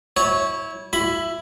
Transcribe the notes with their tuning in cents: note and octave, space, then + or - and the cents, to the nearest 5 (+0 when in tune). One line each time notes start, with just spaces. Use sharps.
E4 -25 C#5 +0
E4 +15 B5 +0